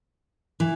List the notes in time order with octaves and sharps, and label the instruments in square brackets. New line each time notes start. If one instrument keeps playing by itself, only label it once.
[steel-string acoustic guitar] E3